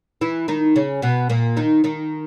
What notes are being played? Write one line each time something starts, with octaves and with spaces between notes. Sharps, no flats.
E3 E4
D#3 D#4
C#3 C#4
B2 B3
A#2 A#3
D#3 D#4
D#3 D#4